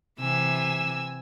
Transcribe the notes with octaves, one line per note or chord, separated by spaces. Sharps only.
C3 E3 G#5 E6